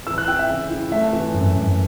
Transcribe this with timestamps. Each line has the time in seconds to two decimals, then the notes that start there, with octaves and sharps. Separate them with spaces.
0.07 E3 E6
0.18 F#6
0.28 E3 G5
0.39 E5
0.50 C#3
0.70 E4
0.92 A3 E5
1.13 E3
1.34 F#2
1.56 F#2